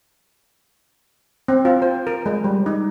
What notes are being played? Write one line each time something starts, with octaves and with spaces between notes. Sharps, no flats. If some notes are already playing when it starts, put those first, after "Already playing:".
C4
F4
C5
A#4
G#3
G3
D#4